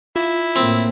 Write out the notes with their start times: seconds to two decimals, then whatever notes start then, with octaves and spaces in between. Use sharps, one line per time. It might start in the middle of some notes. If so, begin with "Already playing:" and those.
0.16 E4 F4
0.56 A2 A#3 C4